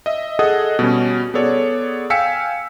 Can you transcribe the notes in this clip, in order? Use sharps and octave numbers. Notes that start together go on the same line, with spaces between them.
D#5 E5
G#4 A4 D#5 F#5 D#6
B2 G3 C#4
B3 G#4 A4 C#5 D5
F5 G5 G#5 E6 B6 C#7